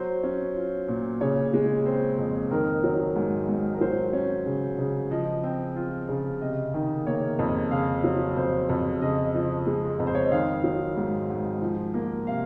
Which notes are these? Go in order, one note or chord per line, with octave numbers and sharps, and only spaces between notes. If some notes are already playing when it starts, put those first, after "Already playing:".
Already playing: F#3 C5
C#4
F4
A#2
C#3 C#5
G#3
C4 C5
F2
D#3 A#4
F#3
G#2
G#2
A#4
F#3 C5
C#4
C#3
C#3
F3 D#5
C4
F4
C#3
C3 D#5
D#3
A#3 C#5
F2
C#3 F5
F#3
F2 C5
F2
C#3 D#5
F3
G#3
F2
C5
C#5
D#5
D#3 F5
F#3
G#2
G#2
F3
A#3
C3 F5